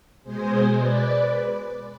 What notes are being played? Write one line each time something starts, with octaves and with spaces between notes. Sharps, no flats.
B2 G#3 G#4 C5
B4 D5